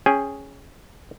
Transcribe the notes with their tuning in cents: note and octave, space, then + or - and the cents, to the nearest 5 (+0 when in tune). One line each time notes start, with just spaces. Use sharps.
C#4 +0 G#4 +0 G5 +20